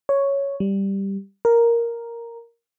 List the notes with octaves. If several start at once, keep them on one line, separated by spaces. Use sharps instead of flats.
C#5
G3
A#4